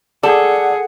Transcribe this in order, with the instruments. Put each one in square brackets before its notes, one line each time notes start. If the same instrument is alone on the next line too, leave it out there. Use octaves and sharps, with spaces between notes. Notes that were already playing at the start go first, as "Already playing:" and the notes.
[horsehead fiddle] G#4 [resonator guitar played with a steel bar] A4 [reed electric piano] D5 [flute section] F#5